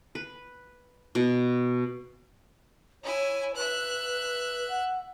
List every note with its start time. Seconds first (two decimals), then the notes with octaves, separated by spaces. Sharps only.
0.15 B4
1.15 B2
3.03 E4 C#5 G#5
3.56 B4 E5 F#6
4.69 F#5